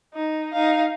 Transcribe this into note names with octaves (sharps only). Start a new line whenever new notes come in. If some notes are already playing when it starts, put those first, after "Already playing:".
D#4
D#4 F5